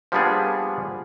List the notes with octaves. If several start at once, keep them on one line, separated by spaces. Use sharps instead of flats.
F3 G3 A#3 B3 D4 G#4